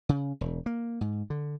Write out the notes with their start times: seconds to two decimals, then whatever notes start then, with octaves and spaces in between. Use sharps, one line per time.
0.09 C#3
0.41 E1
0.66 A#3
1.01 G#2
1.30 D3